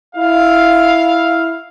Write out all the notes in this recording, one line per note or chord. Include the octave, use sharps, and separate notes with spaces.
E4 F5